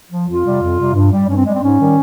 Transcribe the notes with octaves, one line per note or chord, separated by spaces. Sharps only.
F3
F2 F4
C3 G3
F2
C3 G3
G2
G3
G2 C#4
C4
G3 G#3
C4
G#2 C#4
D#3 G3